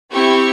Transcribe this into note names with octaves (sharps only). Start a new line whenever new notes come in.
C4 E4 G4 C#6